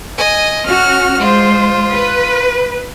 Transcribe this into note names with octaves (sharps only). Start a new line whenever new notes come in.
D#5 G#5
C#4 F#4 F6
G#3 F4 C5
B4